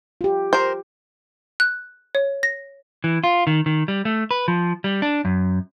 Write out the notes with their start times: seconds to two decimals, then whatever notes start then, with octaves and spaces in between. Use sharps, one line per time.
0.21 F4 G4
0.53 A#4 C5
1.60 F#6
2.15 C#5
2.43 A#6
3.04 E3
3.24 F4
3.47 D#3
3.66 D#3
3.88 G3
4.05 A3
4.31 B4
4.48 F3
4.84 G3
5.02 D4
5.25 F#2